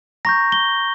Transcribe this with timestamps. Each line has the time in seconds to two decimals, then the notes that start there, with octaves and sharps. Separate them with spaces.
0.25 A#5 C#6 G6 A#6
0.52 G7